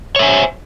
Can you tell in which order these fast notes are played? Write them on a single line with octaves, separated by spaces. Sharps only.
C#5 E5 G#5 C5